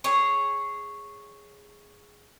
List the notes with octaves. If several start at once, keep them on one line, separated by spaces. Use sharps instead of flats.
G#4 C#5